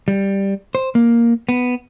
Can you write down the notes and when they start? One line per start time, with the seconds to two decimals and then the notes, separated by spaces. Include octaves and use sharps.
0.08 G3
0.75 C5
0.95 A#3
1.49 B3